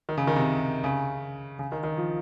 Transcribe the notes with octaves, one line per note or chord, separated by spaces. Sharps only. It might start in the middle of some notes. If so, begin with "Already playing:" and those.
D#3
C#3
D#3
C3
C#3
C#3
D#3
D#3
F3